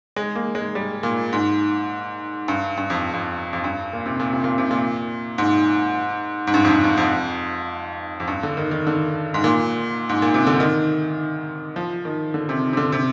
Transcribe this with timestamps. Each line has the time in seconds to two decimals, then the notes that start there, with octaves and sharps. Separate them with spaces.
0.16 G#3
0.35 A#3
0.55 G#3
0.75 G3
1.03 A#2
1.33 G#2
2.48 G2
2.77 G2
2.90 F2
3.13 F2
3.53 F2
3.64 G2
3.93 A#2
4.06 C3
4.20 A#2
4.32 C3
4.44 A#2
4.58 C3
4.71 A#2
5.38 G#2
6.47 G#2
6.54 G2
6.64 F2
6.68 G2
6.84 G2
6.97 F2
8.20 F2
8.28 G2
8.43 D3
8.57 D#3
8.71 D#3
8.87 D3
9.34 G#2
9.44 A#2
10.09 G#2
10.22 A#2
10.34 C3
10.47 D3
10.60 D#3
11.76 F3
12.05 D#3
12.34 D3
12.49 C3
12.73 C3
12.77 D3
12.92 C3